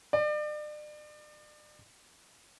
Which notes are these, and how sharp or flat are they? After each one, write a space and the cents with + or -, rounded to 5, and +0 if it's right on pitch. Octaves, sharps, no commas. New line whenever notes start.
D5 +40